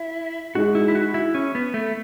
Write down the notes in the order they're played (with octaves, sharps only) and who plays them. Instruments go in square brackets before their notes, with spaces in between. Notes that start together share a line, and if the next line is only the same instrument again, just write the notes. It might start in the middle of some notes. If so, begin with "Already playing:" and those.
Already playing: [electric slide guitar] E4
[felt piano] G#3 D#4 G#4 [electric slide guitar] F#4
[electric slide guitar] E4
E4
F#4
E4
C#4
B3
A3